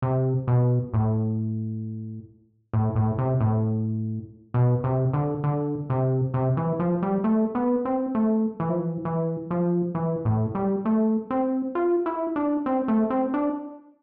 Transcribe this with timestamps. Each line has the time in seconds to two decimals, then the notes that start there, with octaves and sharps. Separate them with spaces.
0.02 C3
0.47 B2
0.94 A2
2.73 A2
2.96 A2
3.18 C3
3.41 A2
4.54 B2
4.84 C3
5.13 D3
5.44 D3
5.90 C3
6.34 C3
6.57 E3
6.79 F3
7.02 G3
7.24 A3
7.55 B3
7.85 C4
8.15 A3
8.60 E3
8.69 F3
8.79 E3
9.05 E3
9.51 F3
9.95 E3
10.25 A2
10.55 G3
10.85 A3
11.30 C4
11.75 F4
12.06 E4
12.36 D4
12.66 C4
12.88 A3
13.10 C4
13.34 D4